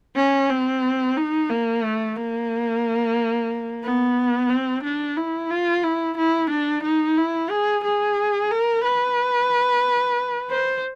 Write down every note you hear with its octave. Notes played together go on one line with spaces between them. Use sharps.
C#4
C4
D#4
A#3
A3
A#3
B3
C4
D4
E4
F4
E4
E4
D4
D#4
E4
G#4
G#4
A#4
B4
C5